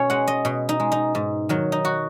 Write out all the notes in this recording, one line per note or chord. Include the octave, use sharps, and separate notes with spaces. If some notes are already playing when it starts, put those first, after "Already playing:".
Already playing: B2 C#4 C#5
G#3 F#5
D#5
B2
D#4
G#3
D#4
G#2
D#3 F#3
D#4
F#4